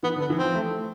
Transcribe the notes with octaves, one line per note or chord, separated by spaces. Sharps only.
E3 B3
D3
B3
E3
F3 C4
A3